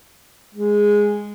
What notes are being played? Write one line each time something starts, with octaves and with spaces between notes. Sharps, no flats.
G#3